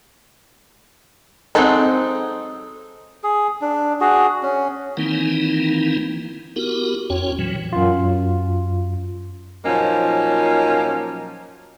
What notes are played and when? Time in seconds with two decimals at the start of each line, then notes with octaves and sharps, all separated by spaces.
1.55 F#3 G#3 C4 D#4 A4
3.23 G#4
3.61 D4
4.01 F#4 G#4
4.43 C#4
4.97 D#3 E3 A#3 C4 D#4 E4
6.56 B3 E4 F#4 G4 A#4
7.10 F2 C#4 F#4 C#5 G5
7.39 A#2 E3 F#3
7.73 F#2 F4
9.65 A#2 F3 F#3 A#3 C#4 D#4